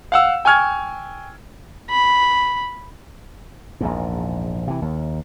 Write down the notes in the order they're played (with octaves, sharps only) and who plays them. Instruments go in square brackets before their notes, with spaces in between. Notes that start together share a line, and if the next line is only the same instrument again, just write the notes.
[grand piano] F5 F#5 E6
G5 G#5 C#6 F6 G#6
[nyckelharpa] B5
[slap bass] A#1 E2 G#2
C3 E3
D#2